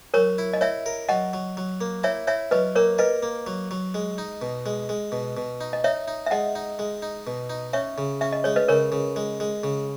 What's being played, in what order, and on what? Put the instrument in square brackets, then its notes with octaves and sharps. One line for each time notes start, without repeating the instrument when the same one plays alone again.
[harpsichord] F#3 [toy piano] A#4 C#5
[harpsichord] E4
[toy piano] D#5
[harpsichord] E4 [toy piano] C#5 E5
[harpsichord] A#4
[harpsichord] F#3 [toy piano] D#5 F#5
[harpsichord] F#3
F#3
A#3
[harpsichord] E4 [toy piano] C#5 E5
[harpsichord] E4 [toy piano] C#5 E5
[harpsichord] F#3 [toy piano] B4 D#5
[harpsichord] A#3 [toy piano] A#4 C#5
[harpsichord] A#4 [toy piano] B4 D#5
[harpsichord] A#3
F#3
F#3
G#3
D#4
B2
G#3
G#3
B2
B2
D#4
[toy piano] D#5
[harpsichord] D#4 [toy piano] C#5 E5
[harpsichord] D#4
[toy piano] E5
[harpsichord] G#3 [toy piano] D#5 F#5
[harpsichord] D#4
G#3
D#4
B2
D#4
[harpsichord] C#4 [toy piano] C#5 E5
[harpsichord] C#3
[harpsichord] C#4 [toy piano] E5
[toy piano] D#5
[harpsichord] G#3 [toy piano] C#5
[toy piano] B4 D#5
[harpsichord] C#3 [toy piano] A#4 C#5
[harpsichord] C#3
G#3
G#3
C#3